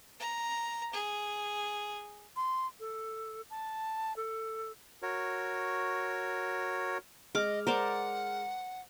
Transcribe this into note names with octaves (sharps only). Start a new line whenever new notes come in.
A#5
G#4
C6
A4
A5
A4
F#4 A#4 C#5
G#3 D#5 D6 F6
A#4 C5 D5 F#5